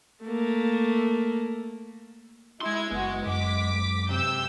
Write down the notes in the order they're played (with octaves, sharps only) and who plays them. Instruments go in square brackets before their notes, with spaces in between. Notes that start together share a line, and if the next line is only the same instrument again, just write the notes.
[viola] A3 A#3
[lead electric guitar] G#3 C6 [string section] E4 G#6
[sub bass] F#1 [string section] B3 F#4
[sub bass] F#2 [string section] D6 B6
[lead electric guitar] C3 [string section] E6 G6